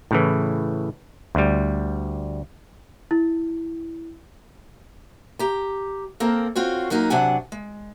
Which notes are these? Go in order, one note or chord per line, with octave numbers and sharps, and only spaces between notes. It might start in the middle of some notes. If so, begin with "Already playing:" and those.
A2 C#3 E3
D2 G3
E4
G4 A#5
A#3 C4 A4 A#4
C4 F4 F#4 C#5
F#2 F#3 A#3 D#4
C3 F#3 D4 F#5 G#5
G#3